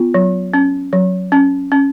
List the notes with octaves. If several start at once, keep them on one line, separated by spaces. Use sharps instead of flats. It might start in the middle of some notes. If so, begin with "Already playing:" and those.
Already playing: B3 F4
F#3
C#4
F#3
C#4
C#4